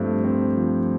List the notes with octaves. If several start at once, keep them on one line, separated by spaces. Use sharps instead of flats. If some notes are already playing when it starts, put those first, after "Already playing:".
Already playing: G2 F3 A3 C4
C4
F3